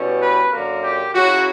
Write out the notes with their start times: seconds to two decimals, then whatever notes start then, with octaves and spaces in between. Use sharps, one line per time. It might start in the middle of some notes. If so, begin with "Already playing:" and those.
Already playing: B2 G3 C#4 E4
0.22 B4
0.52 F#2 D3 A#3 A#4
0.83 G4
1.14 C#3 F#3 C#4 E4 F#4